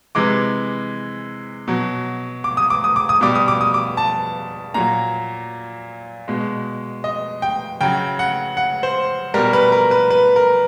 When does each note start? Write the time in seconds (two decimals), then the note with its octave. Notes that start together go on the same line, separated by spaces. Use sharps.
0.15 C3 E3 G#3 D6
1.68 B2 F#3
2.44 D6
2.57 D#6
2.70 D6
2.84 D#6
2.96 D6
3.09 D#6
3.21 B2 G3 D6
3.35 D#6
3.48 D6
3.61 D#6
3.74 D6
3.97 A5
4.74 A#2 F#3 A#5
6.28 B2 G#3
7.04 D#5
7.42 G5
7.81 C#3 F#3 G5
8.19 F#5
8.57 F#5
8.83 C5
9.34 B2 G3 A#4
9.53 B4
9.72 A#4
9.91 B4
10.11 B4
10.36 A#4